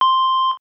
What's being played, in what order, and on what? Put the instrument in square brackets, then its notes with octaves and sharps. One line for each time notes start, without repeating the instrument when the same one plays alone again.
[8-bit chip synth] C6